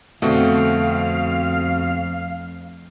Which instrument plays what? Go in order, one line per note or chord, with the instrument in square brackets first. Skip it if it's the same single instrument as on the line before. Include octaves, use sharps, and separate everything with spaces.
[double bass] F2 [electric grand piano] B2 C4 F#4 [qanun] D3 A3 G5 [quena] F5